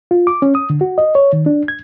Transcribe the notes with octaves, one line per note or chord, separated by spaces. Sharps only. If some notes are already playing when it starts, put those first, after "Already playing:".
F4
D6
C#4
D#6
D3
F#4
D#5
C#5
D#3
D4
G#6